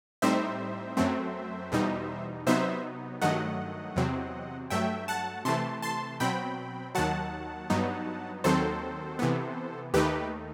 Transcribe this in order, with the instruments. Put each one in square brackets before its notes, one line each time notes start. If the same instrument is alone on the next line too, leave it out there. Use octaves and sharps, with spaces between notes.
[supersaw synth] A2 G3 C4 D#4 C5 E5
F#2 F#3 A3 C4
E2 B2 G3 D#4
C3 F#3 B3 D#4 C5 E5
G2 D#3 F#3 A3 D#5 F#5
E2 C3 F#3 C4
G2 F#3 A3 E5 G5
F#5 A5
C3 E3 A3 A5 C6
A5 C6
B2 F#3 C4 G5 B5
D#2 D#3 F#3 F#5 A5
G2 F#3 B3 D#4
D#2 D#3 F#3 C4 A4 C5
C3 E3 B3
D#2 D#3 A3 D#4 G4 B4